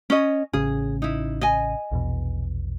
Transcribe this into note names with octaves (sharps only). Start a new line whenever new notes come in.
C#4 D#5
A1 C#3 C#4 G#4
D#4 E4
D#5 G#5
A#1 E2 B2